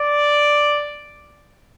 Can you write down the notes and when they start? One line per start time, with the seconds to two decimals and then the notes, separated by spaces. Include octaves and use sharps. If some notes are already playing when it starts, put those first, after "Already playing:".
Already playing: D5